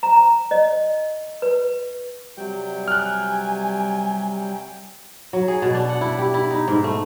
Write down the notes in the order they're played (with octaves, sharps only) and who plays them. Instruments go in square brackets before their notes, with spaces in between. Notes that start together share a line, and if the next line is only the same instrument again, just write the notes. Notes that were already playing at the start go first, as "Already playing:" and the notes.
[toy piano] A#5
A#5
D#5
B4
[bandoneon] C3 F#3 G5 [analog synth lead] G3
[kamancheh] G#5 [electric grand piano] F6 F#6
[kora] F#3
G#4
B2
D4
F#5
E4
G4
E4
D#4
G#2
A3